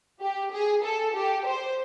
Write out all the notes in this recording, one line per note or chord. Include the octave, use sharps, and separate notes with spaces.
G4
G#4
A4
G4
C5